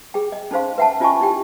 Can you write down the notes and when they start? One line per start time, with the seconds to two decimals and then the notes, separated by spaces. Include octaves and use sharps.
0.14 G#4 G5
0.32 D#5
0.51 C#4 D#4 A4 C5 F5 C6
0.78 B4 E5 F#5 G5 A5
1.00 C#4 F4 D#5 G#5 A5 C#6
1.21 D#4 E4 G4 G5